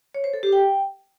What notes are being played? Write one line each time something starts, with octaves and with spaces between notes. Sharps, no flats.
C#5
C5
A4
G4
G5